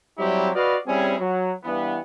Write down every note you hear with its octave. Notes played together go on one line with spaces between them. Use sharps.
F#3 G3 C4 E4 G4
F#4 B4 D5 D#5 F5
G3 C4 C#4 E4 G#4
F#3
G2 E3 B3